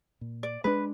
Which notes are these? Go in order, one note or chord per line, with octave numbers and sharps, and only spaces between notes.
A#2
D5
G#3 D4 B4